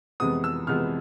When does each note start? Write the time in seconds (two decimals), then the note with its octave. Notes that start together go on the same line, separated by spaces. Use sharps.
0.20 F2 C3 E3 G#3 B3 D#6
0.44 E6
0.67 F2 C3 E3 G#3 B3 F6